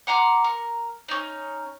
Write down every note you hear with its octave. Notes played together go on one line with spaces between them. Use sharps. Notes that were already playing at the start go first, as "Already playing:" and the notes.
F#5 A#5 C6 D6
A#4
C#4 D#4